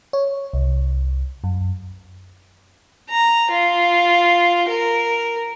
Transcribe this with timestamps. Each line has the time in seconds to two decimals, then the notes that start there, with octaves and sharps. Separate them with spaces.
0.13 C#5
0.53 C2
1.44 F#2
3.10 A#5
3.51 F4
4.69 A#4